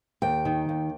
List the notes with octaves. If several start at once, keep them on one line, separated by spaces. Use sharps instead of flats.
D#2 G5
D#3
D#2